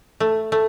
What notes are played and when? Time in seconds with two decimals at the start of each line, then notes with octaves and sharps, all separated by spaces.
0.20 A3
0.52 A3